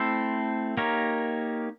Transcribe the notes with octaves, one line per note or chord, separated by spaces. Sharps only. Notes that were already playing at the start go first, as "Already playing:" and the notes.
Already playing: A3 C4 E4 A4 C5
A#3 D#4 G4 A#4 C#5